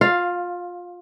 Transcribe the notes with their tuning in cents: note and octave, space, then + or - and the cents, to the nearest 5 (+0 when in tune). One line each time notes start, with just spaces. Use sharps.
F4 +20 F5 +0